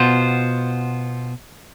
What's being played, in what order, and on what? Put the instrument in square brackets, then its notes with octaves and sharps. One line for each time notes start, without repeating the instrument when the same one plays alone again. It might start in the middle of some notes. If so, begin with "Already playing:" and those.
Already playing: [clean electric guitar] B2 B3 F4 C5